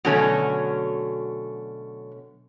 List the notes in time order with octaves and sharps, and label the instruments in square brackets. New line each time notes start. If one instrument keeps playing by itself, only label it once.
[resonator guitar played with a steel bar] B2 D3 F#3 A3 C#4